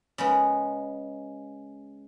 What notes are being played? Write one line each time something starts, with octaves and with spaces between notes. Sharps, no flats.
C#3 G#3 B3